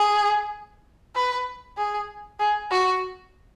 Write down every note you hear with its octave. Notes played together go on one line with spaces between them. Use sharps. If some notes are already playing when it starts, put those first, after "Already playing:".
Already playing: G#4
B4
G#4
G#4
F#4